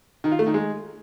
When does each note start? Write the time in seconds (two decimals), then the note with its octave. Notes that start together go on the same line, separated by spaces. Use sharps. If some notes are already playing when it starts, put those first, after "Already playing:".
0.24 D#3
0.32 F4
0.39 A3
0.47 D#3
0.54 G#3